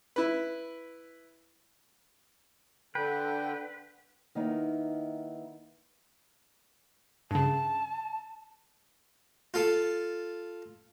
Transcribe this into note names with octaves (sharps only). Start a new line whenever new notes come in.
E4 B4
D3 B4 G5
D#3 A#3 B3 D#4 E4
G2 C#3 A5
F4 A4